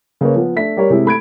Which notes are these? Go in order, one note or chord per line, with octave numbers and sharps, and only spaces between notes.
C#3 A#3 B4 C#5
F3 B3
A3 D4 E5 B6
G3 G4 A#4 C#5
C3 G#3 E4
A3 B5 G#6 D7